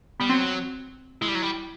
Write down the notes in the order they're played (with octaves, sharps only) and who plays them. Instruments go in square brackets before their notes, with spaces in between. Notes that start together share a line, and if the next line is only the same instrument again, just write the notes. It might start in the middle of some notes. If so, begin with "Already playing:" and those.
[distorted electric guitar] G3 [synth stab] B3
[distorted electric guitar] F#3 [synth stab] C4
[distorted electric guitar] G#3 [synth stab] E4
[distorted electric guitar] G3
F#3
G3